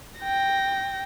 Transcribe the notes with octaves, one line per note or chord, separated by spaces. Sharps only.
G5 A#6